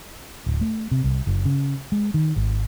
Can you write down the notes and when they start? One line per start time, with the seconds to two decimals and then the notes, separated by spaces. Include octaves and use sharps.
0.46 D1
0.61 A3
0.91 C3
1.04 C2
1.27 F#1
1.45 C#3
1.92 G#3
2.14 D#3
2.36 G#1